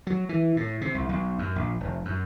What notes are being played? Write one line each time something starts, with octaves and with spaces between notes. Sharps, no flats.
F#3
E3
A2
C3
C2
B1
F#2
A#1
F1
F#2